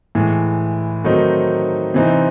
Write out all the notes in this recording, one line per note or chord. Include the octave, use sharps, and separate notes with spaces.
A2 E3 G#3
D#3 F#3 A3 C4 D#4
C3 E3 C4 D#4